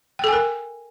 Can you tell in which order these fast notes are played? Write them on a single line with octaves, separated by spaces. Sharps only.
G5 A4 G#5 A#4